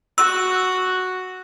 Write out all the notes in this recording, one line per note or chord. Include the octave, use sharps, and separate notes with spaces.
F#4 E6